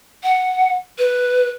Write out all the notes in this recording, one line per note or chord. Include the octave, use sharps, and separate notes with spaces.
F#5
B4